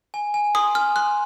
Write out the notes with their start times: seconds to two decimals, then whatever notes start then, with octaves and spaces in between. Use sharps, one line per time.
0.14 G#5
0.34 G#5
0.55 C6 D#6
0.75 G#5 F6
0.96 C6 F#6